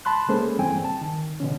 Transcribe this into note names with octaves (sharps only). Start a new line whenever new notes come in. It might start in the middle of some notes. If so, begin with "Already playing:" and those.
A5 B5 C6 F#6
G#3 A#3 C#4 G#4 A4 C5
G2 E3 G3 C4 G5 G#5
A5
D#3
B2 D3 E3 C#4